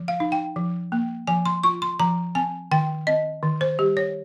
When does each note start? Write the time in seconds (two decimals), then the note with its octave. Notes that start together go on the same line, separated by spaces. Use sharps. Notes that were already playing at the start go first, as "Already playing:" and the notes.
Already playing: F3
0.08 F5
0.20 D#4
0.32 G5
0.56 F3
0.92 A#3
1.27 F3 G#5
1.46 C6
1.63 F4 C#6
1.82 C6
2.00 F3 A#5
2.35 C4 G#5
2.71 D#3 G5
3.07 C4 D#5
3.43 D#3
3.61 C5
3.79 G3 G4
3.97 C#5